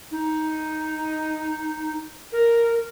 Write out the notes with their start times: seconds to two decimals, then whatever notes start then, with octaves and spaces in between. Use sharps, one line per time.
0.11 D#4
2.32 A#4